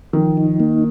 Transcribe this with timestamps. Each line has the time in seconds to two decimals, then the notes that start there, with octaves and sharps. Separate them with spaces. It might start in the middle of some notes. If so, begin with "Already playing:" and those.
0.13 D#3 F3
0.37 D#4
0.60 A#3